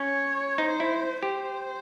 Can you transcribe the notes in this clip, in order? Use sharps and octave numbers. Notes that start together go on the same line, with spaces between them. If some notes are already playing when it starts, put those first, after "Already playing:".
Already playing: C#4 C#5
D#4 C5
E4
G4 C5